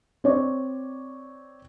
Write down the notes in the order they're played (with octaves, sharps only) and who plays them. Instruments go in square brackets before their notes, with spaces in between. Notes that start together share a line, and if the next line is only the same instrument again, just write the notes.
[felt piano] C4 C#5 D5